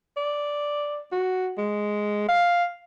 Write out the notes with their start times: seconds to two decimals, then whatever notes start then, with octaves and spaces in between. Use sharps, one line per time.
0.17 D5
1.12 F#4
1.58 G#3
2.29 F5